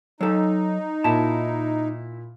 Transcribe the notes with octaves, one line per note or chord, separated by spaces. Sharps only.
F#3 D#4 A4
A#2 E4 A5